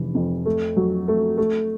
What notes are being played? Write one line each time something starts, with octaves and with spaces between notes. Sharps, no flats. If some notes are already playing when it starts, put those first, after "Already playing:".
Already playing: F1 E3
F2
A3
F#3
A3
A3